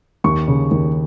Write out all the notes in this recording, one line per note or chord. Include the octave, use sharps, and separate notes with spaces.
D#2 C#6
C#3
D#2